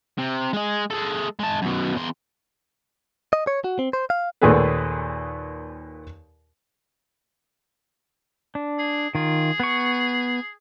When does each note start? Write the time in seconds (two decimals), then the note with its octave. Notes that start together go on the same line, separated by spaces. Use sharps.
0.19 C3
0.53 G#3 G#4
0.91 G#3 A4
1.39 G#3 A5
1.62 F#2 B2
1.96 E2 C6
3.33 D#5
3.47 C#5
3.64 F#4
3.79 C4
3.93 C5
4.10 F5
4.41 D#2 A#2 D#3 G#4 A4 B4
8.55 D4
8.79 G#4
9.15 D#3 F4 G#4
9.60 B3 C#6